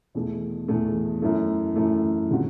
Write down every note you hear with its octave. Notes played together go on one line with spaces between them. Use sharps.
E2 B2 A3
E2 B2 A3
F#2 E3 A3
F#2 E3 A3
D3 G3 C4 F#4